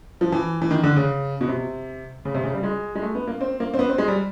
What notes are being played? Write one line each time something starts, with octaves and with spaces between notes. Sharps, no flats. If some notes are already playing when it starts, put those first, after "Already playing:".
F3
E3
E3
D#3
D3
C#3
B2
C3
C#3
C3
C#3
G3
G#3
G#3
A3
B3
A#3
C4
A#3
C4
B3
C4
G#3
G3